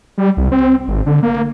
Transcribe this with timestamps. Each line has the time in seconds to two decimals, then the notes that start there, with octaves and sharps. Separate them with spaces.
0.18 G3
0.37 C2
0.52 C4
0.87 G#1
1.06 D3
1.23 A#3